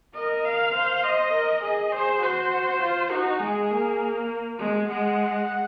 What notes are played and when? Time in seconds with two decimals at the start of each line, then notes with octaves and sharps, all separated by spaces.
0.14 A#4 D#5
0.44 F5
0.74 C5 F5
1.03 D#5
1.33 A#4
1.62 G#4 D#5
1.92 G#4 C5
2.21 F#4 C5
2.81 F4
3.10 D#4 F#4
3.40 G#3 G#4
3.70 A#3
4.59 G#3
4.88 G#3 F#5